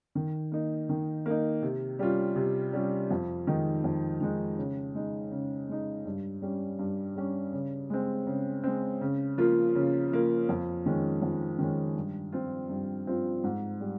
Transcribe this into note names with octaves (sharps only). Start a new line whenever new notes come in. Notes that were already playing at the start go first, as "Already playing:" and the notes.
D#3
A#3 D#4
D#3
A#3 D#4
C3
G3 C#4 F4
C3
G3 C#4 F4
F2
D#3 G#3 D#4
F2
D#3 G#3 D#4
C#3
G#3 D#4
C#3
G#3 D#4
G2
G3 C#4
G2
G3 C#4
C#3
G#3 C4
C#3
G#3 C4
C#3
F3 A#3 F4
C#3
F3 A#3 F4
F2
D#3 G#3 C#4
F2
D#3 G#3 C#4
G2
F3 C4 F4
G2
F3 C4 F4
G#2
G3